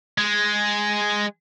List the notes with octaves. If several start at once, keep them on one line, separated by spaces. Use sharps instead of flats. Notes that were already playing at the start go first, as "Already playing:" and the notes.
G#3